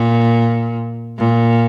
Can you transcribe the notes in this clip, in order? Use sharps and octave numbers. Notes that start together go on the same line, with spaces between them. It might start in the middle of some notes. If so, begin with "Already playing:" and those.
Already playing: A#2
A#2